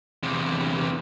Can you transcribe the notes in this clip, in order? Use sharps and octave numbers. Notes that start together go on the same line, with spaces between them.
E2 C3